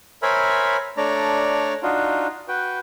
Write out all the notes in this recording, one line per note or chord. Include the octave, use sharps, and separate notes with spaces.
A#4 C5 C#5 E5 G#5 B5
A3 D4 C#5 D5 A#5
D4 D#4 F4 F#4
F#4 B4 G5